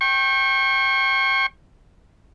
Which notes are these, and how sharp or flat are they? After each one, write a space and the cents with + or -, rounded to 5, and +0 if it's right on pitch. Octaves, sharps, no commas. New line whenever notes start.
G5 +0 C#6 -35